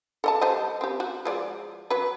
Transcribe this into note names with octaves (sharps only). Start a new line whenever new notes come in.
A4 D#5 A5
G3 C5 D#5
C4 G4
F#4
F3 G#3 D5
F#3 B4